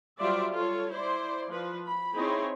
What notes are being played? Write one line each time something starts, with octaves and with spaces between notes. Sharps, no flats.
F#3 G3 F4 C5 D5 E5
F4 A4 C#5
E4 C5 D5 C6
F3 B4
B5
C4 D#4 E4 G#4 C#5